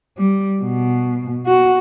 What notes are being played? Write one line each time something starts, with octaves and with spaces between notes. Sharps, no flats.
G3
B2
F#4